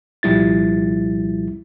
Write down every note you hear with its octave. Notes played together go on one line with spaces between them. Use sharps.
C2 A#2 F3 G3 E4 A6